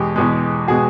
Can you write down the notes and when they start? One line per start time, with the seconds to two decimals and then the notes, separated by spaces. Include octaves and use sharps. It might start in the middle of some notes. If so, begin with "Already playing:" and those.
Already playing: E2 B2 G#3 G4
0.16 E2 B2 G#3
0.68 B2 G#3 F#4 G#4